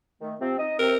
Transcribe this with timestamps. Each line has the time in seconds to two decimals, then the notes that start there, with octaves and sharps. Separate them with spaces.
0.21 D#3 A3
0.40 C3 F3 C4
0.59 D#4 D#5
0.79 C3 C4 A#4